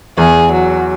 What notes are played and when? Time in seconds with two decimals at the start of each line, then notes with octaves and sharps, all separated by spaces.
0.18 E2 G#4
0.53 F#3